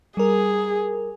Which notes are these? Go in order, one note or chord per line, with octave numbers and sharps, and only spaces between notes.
G3 G#4 A#4